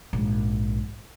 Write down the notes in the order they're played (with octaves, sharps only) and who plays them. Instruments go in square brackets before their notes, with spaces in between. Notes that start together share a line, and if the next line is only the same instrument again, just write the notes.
[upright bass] A#1 G#2